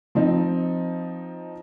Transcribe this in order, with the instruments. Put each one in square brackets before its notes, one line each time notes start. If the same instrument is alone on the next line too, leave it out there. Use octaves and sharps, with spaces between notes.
[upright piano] F3 C4 D#4